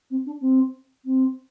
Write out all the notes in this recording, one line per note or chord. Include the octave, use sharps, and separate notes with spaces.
C4
D4
C4
C4